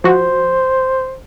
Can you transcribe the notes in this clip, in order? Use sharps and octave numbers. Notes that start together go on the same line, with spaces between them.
F3 F#4 C5